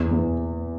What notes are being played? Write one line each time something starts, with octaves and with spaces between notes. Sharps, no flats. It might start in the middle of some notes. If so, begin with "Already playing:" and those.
Already playing: E2
E2